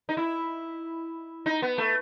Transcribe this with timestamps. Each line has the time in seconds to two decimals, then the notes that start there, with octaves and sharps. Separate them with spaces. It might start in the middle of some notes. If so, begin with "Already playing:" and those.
0.09 D#4
0.17 E4
1.46 D#4
1.62 B3
1.78 A3